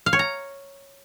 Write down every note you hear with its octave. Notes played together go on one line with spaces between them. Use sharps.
F5
C#5
A#5